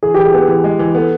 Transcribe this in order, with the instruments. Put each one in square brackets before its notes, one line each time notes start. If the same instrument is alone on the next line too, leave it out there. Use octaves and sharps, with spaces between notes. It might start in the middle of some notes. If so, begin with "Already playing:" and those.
[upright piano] E3 [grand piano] G#4
[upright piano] E3 [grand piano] G4
[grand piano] G#4
[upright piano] B3
E3
G#3
E3
[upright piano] B3 [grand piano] A4